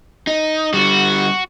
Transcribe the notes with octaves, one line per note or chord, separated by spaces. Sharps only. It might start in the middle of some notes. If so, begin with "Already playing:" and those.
D#4
D3 G3 F#4